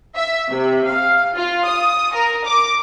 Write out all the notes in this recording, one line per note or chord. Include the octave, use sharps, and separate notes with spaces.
E5
C3
F5
F4
D#6
A#4
D6